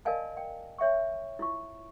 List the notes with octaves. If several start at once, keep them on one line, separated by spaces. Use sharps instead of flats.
A#4 D5 D#5 F5 G#5 A5
G5
C#5 E5 G5 C#6
E4 F4 C#6